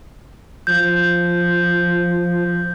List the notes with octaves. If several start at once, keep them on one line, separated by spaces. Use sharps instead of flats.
F3 G6